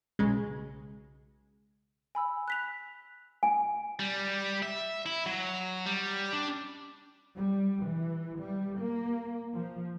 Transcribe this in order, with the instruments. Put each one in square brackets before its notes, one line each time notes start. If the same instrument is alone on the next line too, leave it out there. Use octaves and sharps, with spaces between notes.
[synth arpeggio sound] B1 C#3 G#3
[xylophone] G#5 B5 E6
F#6 B6 F7
[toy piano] G#5
[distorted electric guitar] G3
E5
E4
F#3
G3
D4
[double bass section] G3
E3
G3
A#3
F3